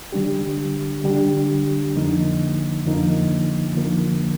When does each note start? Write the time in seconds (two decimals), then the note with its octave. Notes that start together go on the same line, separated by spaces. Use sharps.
0.12 D3 G3 D4 G4
1.04 D3 G3 D4 G4
1.95 F2 D3 F3 A#3 D#4
2.85 F2 D3 F3 A#3 D#4
3.76 D3 F3 A#3